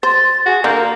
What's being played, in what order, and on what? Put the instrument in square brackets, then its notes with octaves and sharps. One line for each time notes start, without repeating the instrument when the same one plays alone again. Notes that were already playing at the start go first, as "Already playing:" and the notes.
[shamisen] C5 [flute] A6
[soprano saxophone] F#4 [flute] G#4
[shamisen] D3 [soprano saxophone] A#3 [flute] G6
[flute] A#4